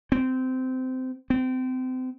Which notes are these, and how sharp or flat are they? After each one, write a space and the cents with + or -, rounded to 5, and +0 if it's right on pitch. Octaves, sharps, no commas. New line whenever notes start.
C4 -20
C4 -30